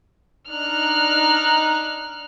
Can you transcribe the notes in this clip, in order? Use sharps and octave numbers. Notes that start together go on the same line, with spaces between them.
D4 D#4 F6 F#6